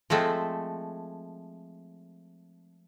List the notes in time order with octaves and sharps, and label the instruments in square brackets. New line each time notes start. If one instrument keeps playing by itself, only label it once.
[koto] F3 G#3 A3 C4